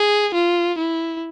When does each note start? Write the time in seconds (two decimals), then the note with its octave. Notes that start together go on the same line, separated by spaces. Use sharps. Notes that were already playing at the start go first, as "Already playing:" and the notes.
Already playing: G#4
0.34 F4
0.79 E4